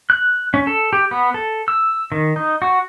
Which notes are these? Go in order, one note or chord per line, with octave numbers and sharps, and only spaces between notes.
F#6
C#4
A4
G4
B3
A4
E6
D#3
D#4
F#4